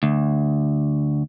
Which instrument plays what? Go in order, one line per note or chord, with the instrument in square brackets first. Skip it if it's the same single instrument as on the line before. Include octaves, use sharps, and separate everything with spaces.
[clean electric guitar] D2